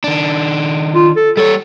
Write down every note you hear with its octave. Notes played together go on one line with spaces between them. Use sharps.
D#3 D4
F4
A4
G3 A4 C#5